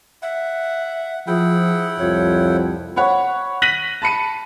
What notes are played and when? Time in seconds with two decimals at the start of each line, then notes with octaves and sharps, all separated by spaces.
0.22 E5 F#5
1.27 F3 E4 G#4 F#5 G5
1.99 C2 F2 F3 C#5
2.96 C#5 F#5 B5 C#6
3.62 F#6 A#6 B6 D#7 F#7
4.02 A5 B5 C#7 D#7